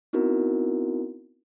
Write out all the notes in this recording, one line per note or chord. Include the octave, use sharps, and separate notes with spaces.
B3 C4 D#4 E4 F#4 A#4